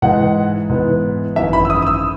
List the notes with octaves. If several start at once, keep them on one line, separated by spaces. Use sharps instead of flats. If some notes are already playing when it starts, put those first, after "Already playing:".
G#2 E3 G#3 D#4 F#5
G#2 E3 B3
G#1 F#2 E3 E5
B5
E6
D#6
D#6
E6